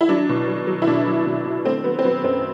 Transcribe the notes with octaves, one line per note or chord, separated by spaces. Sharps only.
E4
F#3 D4
B2
F#3
F#3
E4
B2 D4
F#3
B2
B2
A3 C4
F#3 B3
C4
F#3 B3
F#2 C4